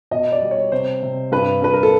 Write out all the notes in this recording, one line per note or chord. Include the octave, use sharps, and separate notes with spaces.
B2 D#5
D5
G3
C#5
C3 C5
C3
G2 B4
G2 B4
A#4
A4